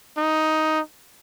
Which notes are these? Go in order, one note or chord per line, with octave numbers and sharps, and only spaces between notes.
D#4